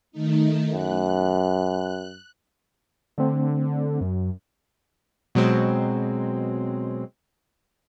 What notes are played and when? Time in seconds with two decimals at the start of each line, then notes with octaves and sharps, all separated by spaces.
0.12 D#3 A3 D#4
0.73 F#2 F#6
3.18 D3 A3 C4
4.01 F#2
5.35 B2 F#3 G#3 C4